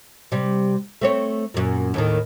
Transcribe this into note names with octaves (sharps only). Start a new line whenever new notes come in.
C3 G3
A3 C4 C#5
F#2 A#2
D#2 A2 D#3